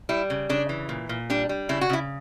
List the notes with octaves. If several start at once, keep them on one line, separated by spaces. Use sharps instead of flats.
G3 E4
C#3
C#3 D4
E3
A#2
A#2
G3 D4
G3
C#3 E4
F#4
C#3 E4